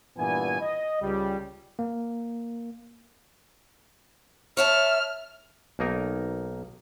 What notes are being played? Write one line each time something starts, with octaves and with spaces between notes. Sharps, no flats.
G2 A#2 E3 B3 G#5
D#5
C#2 G3
A#3
C#5 E5 A5 F6
B1 A#3 D#4 A#4